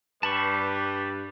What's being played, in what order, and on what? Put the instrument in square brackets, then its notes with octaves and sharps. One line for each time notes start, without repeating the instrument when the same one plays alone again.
[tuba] G2 [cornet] G3 [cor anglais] B4 [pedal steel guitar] A5 B5 C#6